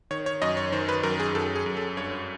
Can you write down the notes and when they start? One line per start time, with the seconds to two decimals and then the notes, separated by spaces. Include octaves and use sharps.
0.11 D#3 C#5
0.26 C#5
0.42 F#2 D#5
0.57 C#5
0.72 D#3 C5
0.89 B4
1.03 F#2 A#4
1.20 G#4
1.35 F#2 A4
1.56 G#4
1.66 F#2
1.77 A4
1.97 G2 C#5